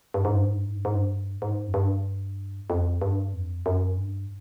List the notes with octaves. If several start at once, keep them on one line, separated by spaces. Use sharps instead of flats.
G2
G#2
G2
G#2
G2
G#2
G2
G#2
G2
G#2
F#2
G2
F2
G2
F2
F#2
G2